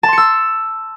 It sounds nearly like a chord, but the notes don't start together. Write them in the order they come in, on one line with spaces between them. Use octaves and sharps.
A5 C6 C#7 E6